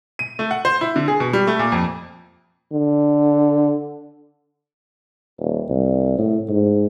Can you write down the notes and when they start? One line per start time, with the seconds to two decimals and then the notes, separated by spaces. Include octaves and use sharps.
0.19 D#7
0.39 A3
0.51 F#5
0.65 C5
0.81 E4
0.96 D3
1.08 G#4
1.20 B2
1.33 G3
1.47 A3
1.59 A#2
1.72 F2
2.72 D3
5.39 D#1
5.69 C2
6.19 A2
6.49 G#2